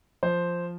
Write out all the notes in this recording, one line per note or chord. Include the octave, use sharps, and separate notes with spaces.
F3 C5